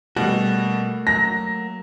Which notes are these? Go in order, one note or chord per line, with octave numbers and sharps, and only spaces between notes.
B2 G3 A3 A#3 F#4
F#3 A#6